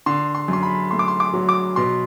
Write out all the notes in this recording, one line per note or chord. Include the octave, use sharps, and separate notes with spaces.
D3 C6
C6
F#2 C6
B5
A3 C6
D6
C6
D6
F#3
D6
B2 C6